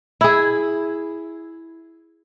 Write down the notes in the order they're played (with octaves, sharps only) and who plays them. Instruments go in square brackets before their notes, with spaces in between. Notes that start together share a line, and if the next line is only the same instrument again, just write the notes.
[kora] E4 G#4